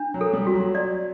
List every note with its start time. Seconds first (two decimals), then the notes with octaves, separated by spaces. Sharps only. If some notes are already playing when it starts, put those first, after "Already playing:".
Already playing: D4
0.14 F#3
0.21 A4
0.33 G3
0.47 F#4
0.54 F#3
0.75 D5